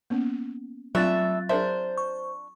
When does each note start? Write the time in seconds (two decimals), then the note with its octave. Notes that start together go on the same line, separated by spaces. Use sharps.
0.10 A#3 B3 C#4
0.95 F#3 G3 A3 C4 D4 F4 E5 A6
1.49 D4 G#4 A#4 C5 E5 A5
1.98 C#6